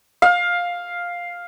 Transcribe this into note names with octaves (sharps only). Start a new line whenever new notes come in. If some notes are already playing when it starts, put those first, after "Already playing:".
F5